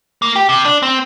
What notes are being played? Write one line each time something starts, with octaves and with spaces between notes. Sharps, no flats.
A#3
G4
C3
D4
C4